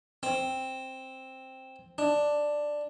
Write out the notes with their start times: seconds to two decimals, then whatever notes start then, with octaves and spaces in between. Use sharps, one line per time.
0.23 C4
1.98 D4